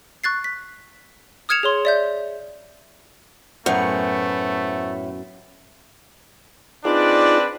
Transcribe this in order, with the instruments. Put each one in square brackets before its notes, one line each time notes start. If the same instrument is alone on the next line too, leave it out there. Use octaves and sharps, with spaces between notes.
[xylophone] C#6 F#6 A6 C7
B6
D#6 F6 G#6 C#7 E7 F7
G#4 C#5 C6
D5 E5 G6
[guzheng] F#2 B3 [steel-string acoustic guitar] A2 [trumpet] A3 [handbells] C5 F#5 C#7
[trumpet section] C4 D4 B4 [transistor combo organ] D#4 F4 G#4 [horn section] D5